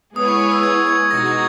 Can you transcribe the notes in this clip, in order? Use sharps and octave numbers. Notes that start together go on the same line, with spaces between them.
G#3 B3 E4 G#4 C#5 D#6
C#6
D#6
E6
G#6
G#6
B2 G#3 D#4 F#4 A#6
G#6